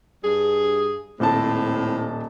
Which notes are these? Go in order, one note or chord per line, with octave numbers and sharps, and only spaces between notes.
G2 G#4
D#1 A2 C4 A5